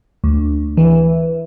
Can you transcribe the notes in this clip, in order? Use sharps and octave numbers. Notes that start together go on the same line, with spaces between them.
D2
E3